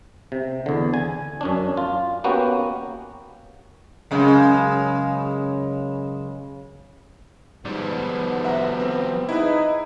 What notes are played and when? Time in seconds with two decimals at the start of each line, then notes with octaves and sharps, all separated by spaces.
0.32 C3
0.66 E2 D3
0.94 G#5
1.41 F#2 C#4 D4
1.77 F4
2.24 A#3 B3 C#4 F#4 G4
4.11 F#2 C#3 G#3
7.65 G#2 F3 G3 B3
8.44 E5 F#5 A#5
8.76 C4 G4
9.29 D#4 E4 G#4 B4